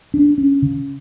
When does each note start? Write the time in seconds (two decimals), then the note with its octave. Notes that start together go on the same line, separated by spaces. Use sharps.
0.14 D4
0.38 C#4
0.62 C#3